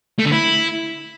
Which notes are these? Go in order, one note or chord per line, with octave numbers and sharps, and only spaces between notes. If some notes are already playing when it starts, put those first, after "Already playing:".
A3
D3
E4